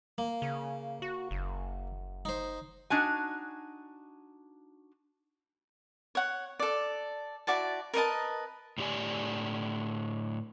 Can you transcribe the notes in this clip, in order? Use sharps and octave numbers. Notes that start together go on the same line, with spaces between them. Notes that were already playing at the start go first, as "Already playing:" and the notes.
A#3
C#3
F#4
F#1
D#4 C5
D4 D#4 F#4 G#5
C#5 F#5
A4 D5
E4 F#4 D5 A5
A#4 B4 D#5 A5
A2 D3 G4 D5 G#5